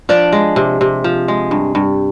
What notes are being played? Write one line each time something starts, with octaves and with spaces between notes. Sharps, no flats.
F3 D4 D5
G#3
C3
C3
F3
G#3
G2
G2